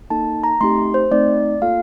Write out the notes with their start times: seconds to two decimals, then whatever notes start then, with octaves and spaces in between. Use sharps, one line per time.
0.10 A#3 D#4 A4 A5
0.44 A#5
0.61 A3 C4 D#4 G4 C6
0.94 C5
1.11 A3 C4 D#4 D5
1.62 A#3 F4 A4 F5